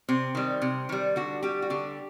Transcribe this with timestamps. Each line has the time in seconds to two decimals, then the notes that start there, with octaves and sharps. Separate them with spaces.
0.09 C3 C4
0.35 D#3 G3
0.62 C3
0.89 D#3 G3
1.16 D3 F#4
1.43 G3 G4
1.62 F#4
1.70 D3 G4